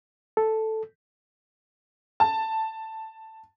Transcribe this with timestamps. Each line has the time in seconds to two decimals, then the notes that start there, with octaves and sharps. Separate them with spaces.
0.37 A4
2.20 A5